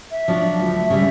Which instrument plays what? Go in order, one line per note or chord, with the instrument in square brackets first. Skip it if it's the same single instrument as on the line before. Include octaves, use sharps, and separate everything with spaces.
[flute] E5
[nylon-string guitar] F3 F#3 D4
D2
[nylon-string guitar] C#3 G3 [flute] E5